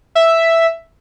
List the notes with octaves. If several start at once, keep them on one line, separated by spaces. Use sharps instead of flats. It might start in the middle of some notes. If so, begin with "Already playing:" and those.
E5